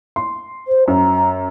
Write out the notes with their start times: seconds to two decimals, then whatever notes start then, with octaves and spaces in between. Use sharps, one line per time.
0.16 C6
0.68 C5
0.88 F#2 A#5